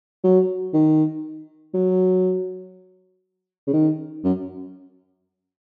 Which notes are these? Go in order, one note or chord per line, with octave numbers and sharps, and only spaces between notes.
F#3
D#3
F#3
C#3
D#3
F#2